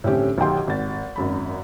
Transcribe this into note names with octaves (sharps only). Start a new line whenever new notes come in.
A2 D3 G3 C4 C#4 G4
B1 D#3 G4 G5 C6
G#1 A6
G#1 F#2 B5